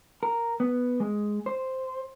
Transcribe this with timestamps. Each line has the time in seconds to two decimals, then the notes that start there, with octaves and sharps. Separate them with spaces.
0.23 A#4
0.60 B3
1.00 G#3
1.46 C5